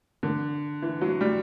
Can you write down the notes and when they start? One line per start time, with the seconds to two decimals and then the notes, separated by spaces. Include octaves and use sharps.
0.23 D3
0.82 E3
1.01 F#3
1.21 G3